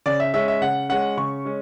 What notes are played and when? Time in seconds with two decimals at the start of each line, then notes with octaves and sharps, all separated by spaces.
0.06 C#3 D5
0.20 E5
0.34 G#3 C#4 E5
0.48 E5
0.62 C#3 F#5
0.89 G#3 C#4 F#5
1.17 C#3 C#6
1.45 G#3 C#4